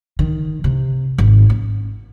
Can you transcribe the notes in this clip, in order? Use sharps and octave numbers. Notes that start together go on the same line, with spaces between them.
D#3
C3
G#1
C#4